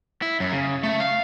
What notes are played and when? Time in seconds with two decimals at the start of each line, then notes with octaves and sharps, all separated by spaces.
0.22 E4
0.40 F#2
0.52 C#3
0.83 A3
1.00 F5